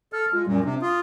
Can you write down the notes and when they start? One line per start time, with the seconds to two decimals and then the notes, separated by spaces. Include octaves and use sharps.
0.13 A4 F6
0.33 G#3 F4
0.47 F#2 A#2 G3
0.64 C3 D4
0.82 F4 D#6